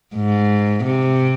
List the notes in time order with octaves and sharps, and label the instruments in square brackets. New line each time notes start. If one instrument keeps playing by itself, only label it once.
[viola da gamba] G#2
C3